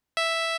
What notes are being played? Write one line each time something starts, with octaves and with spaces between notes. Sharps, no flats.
E5